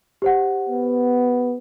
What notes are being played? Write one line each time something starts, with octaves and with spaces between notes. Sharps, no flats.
G4 C5 F#5
B3